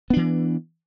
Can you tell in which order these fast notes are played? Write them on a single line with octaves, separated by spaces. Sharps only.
B3 D4 E3